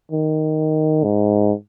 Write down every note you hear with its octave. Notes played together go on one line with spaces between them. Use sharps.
D#3
G#2